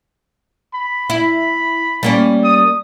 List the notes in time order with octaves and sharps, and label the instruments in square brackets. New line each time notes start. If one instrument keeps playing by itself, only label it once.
[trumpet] B5
[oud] E4
G3 A#3 C#4
[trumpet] D#6